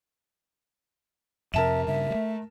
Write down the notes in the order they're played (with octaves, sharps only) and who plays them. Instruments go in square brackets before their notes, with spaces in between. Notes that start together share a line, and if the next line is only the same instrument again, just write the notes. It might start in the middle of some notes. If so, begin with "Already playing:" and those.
[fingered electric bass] F2 C3 [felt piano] A#4 A5 E7 [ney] E5
[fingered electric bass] G2 C#3 [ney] E5
[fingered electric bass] G3 A3